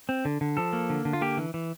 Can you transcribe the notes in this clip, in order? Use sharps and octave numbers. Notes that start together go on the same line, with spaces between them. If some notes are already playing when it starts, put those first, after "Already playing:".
C4
D3
D3
F3 A4
A#3
D3
D3
F4
A#3 G4
E3
E3